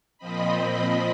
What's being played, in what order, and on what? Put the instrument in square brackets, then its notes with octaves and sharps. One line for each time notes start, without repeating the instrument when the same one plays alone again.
[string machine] A#2 F3 C4 D#5 B5